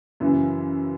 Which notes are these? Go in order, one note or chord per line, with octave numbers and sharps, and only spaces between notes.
F#2 C#3 E3